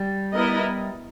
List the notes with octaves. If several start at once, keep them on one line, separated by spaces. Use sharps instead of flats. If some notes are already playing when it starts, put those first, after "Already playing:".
Already playing: G3
B3 E4 A#4 D#5